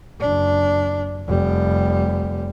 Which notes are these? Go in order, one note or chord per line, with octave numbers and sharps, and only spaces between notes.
F#1 D4
F1 G3